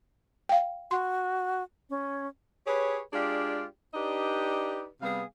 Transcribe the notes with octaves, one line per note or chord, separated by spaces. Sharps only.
F5 G5
F#4 C6
C#4
G4 G#4 B4 C#5
G#3 D4 F4 G4 G#4 D5
D4 D#4 G4 B4 D5 D#5
C3 G3 B3 G#4 F5